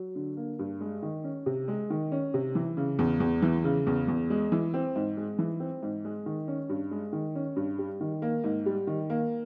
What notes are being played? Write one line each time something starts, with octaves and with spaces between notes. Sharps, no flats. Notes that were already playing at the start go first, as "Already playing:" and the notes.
Already playing: F#3
D3
A#3
G2
G#3
D#3
C#4
C3
G#3
D#3
C#4
C3
E3
C#3
E2
E2
E3
C#3
E2
E2
G#3
E3
C4
G#2
G#3
E3
C4
G#2
G#3
D#3
C#4
G2
G#3
D#3
C#4
G2
G3
D#3
A#3
G#2
G3
D#3
A#3